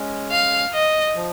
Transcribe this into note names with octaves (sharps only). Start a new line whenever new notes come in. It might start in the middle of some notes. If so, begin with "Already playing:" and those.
Already playing: G#3 C#4
F5
D#5
F3